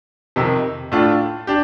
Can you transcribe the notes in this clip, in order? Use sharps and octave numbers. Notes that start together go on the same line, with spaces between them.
F2 C3 D#3
A2 A3 D4 F4
D4 G4